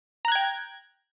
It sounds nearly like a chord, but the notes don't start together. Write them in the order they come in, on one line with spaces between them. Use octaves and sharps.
A#5 F#6 G#6 G5